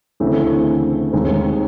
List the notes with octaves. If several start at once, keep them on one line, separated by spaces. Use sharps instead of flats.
D2 C#3 E3 A3 C4
D#2 D#3 G#3 C4